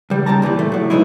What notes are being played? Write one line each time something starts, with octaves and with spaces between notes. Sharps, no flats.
C#2 G3
D#2 C#3 G4 A5 A#5
D2 A#2 E3 G3
A3
A2 F#3
G#2 D#3 E3 G#3 D#4 E4